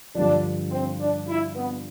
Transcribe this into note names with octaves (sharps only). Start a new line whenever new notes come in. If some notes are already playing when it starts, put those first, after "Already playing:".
G2 D3 F3 D4
C4
D4
E4
B3